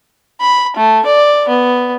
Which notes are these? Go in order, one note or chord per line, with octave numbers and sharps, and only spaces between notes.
B5
A3
D5
B3